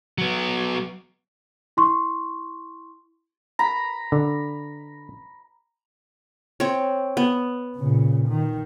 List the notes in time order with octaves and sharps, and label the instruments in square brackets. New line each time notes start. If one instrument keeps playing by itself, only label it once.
[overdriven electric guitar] F#3 B3
[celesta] E4 C6 C#6
[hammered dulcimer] A#5 B5
[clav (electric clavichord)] D3
[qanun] C4 C#5
B3
[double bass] A#2 C#3
D#3